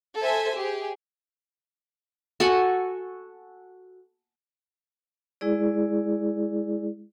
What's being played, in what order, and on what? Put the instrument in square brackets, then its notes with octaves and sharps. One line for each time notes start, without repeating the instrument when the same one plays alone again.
[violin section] A4 C5 E5 G#5
G4 G#4
[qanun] F#4 A4 F#5 G#5
[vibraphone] G#3 E4 G#4 D5